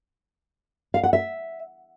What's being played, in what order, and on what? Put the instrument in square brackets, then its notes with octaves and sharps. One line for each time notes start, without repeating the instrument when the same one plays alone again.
[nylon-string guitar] F5
F#5
E5